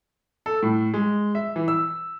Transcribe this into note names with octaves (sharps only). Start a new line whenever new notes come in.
A4
A2
G#3
E5
E3
E6